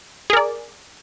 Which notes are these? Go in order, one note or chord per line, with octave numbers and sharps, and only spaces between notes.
G#4 A#4 D5